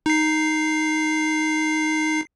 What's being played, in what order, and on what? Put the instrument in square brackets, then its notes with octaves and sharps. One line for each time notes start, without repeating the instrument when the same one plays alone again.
[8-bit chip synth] D#4 C7